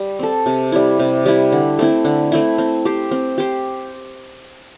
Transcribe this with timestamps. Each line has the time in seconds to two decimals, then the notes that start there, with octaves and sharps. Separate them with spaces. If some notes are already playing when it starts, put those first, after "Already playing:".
Already playing: G3
0.19 C4 A4
0.46 C3
0.72 G3 E4
0.99 C3
1.26 G3 E4
1.52 D3
1.79 A3 C4 E4
2.05 D3
2.32 A3 C4 E4
2.58 C4
2.85 G4 C5
3.11 C4
3.38 G4 C5